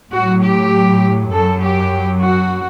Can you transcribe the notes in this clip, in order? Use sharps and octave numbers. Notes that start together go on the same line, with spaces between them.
A2 F#3 F#4
G4
F#2 F#3 A4
G4
F#4